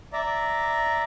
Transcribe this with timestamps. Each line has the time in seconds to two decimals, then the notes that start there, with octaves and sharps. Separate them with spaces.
0.13 D5 E5 A#5